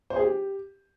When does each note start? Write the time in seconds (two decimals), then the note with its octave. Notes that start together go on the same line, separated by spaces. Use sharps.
0.10 C5
0.16 G#4
0.22 G4